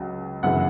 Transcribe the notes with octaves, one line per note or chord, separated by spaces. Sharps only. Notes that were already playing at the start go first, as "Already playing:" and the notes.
Already playing: C#2 C#3 F#3
G1 F#2 C#3 E3 F#5